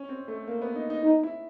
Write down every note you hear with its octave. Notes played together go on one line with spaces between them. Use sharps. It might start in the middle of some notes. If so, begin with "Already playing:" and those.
Already playing: C#4
C4
A3
A#3
B3
D#4
D#4
D#4
E4